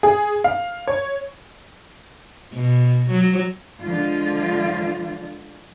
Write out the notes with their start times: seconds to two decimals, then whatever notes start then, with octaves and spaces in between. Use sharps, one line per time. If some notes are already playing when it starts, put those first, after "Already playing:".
0.03 G#4
0.44 F5
0.87 C#5
2.54 B2
3.11 F#3
3.82 D3 F3 G#3 F4